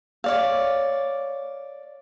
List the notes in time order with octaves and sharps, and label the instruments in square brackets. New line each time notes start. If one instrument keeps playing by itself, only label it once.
[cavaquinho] C#5 D5 F5